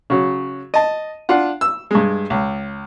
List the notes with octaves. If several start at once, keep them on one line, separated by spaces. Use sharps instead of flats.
C#3 F#3
D#5 A5
D4 F4 F#5
E6
G2 G#3
C#2